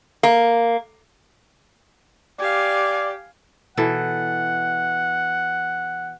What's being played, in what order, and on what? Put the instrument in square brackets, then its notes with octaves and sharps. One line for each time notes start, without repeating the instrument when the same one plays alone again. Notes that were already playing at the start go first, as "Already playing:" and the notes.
[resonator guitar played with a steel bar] A#3
[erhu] G4 [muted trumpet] D5 [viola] F5 G#5
[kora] B2 E3 A4 [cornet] F#5